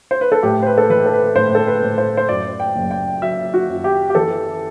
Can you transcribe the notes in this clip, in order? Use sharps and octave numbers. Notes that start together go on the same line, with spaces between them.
C5
B4
A4
A2 G4
C5
B4
A4
E3 B4
A4
B4
A2 C5
A4
B4
A2
C5
C5
F#2 D5
G5
F#1
G5
F#3 E5
F#4
F#2
G4
G4
E3 A4